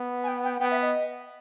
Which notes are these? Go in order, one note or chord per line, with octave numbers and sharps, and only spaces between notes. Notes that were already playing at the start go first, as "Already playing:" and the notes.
Already playing: B3
G#5
G5
G5
B3 G5
E5
D#5